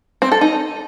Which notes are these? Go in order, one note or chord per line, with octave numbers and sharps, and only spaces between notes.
C4
A4
D#4